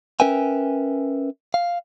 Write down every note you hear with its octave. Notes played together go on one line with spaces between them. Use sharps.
C#4 A#4 B4 E5 G5 G#5
F5